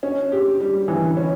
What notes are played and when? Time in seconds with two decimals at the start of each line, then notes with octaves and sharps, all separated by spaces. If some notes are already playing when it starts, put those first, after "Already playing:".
0.03 C#4
0.32 G4
0.60 G3
0.88 E3
1.17 C#4